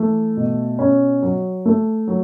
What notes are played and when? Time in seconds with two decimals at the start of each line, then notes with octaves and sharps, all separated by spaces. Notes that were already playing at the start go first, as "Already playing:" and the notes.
Already playing: E3 A3
0.37 B2
0.79 C#4
1.23 F#3
1.66 A3
2.08 F#3